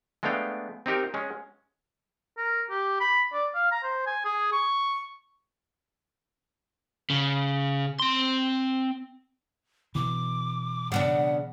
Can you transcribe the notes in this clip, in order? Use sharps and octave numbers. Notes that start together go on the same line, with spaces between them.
G#3 A3 B3 D4 F5 G5
C4 D#4 G4 A#4
G#3 C#4
A#4
G4
B5
D5
F5
A#5
C5
G#5
G#4
C#6
C#3
C4 C6
B2 E3 D6
C#3 B3 D4 F#5